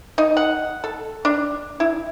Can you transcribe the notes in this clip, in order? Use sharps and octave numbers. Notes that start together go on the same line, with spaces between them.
D#4
F#5
A4
D4
E4